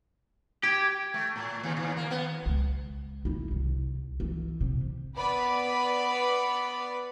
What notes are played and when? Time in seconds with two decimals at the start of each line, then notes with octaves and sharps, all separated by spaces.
0.63 G4 G#6
1.14 A3
1.36 A2
1.63 D#2
1.77 D#2
1.97 A#3
2.11 B3
2.46 C#2
3.25 D#4 E4
3.51 C2
4.20 E3
4.61 C3
5.16 B3 B4 D5 B5